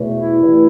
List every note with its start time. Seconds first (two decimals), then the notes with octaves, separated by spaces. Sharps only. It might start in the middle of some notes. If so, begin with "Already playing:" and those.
Already playing: E2 B2 A3
0.15 E4
0.43 G2 E3 A3